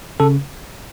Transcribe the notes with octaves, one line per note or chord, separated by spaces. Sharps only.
C#3 A4